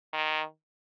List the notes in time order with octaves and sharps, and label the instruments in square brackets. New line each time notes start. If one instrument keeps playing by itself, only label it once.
[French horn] D#3